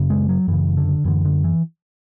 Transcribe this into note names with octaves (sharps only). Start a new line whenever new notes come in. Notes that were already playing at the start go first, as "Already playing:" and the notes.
Already playing: F#2 C#3
G#3
F#3
F#2 C#3 E3
D3
F#2 D3 E3
D3
E3